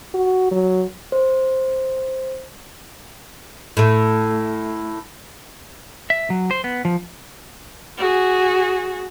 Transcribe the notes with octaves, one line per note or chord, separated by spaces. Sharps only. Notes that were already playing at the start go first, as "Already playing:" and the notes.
F#4
F#3
C5
A2 A3
E5
F#3
C5
B3
F3
F#4 G#4